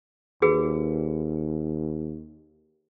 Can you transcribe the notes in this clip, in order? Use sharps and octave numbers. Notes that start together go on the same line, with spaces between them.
D#2 F#4 G#4 B4